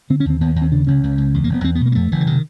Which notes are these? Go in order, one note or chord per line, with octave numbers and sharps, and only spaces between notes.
D3 C4
C#4
D#2 C4
D#2 B3
D#2
C4
C#3 D4
C#2 C#4
C#2
C#2
E2
A#3
F1 B3
E2 C4
B3
B2 A#3
A#3
F2 A3
F#1 E3
D3
C3 D#3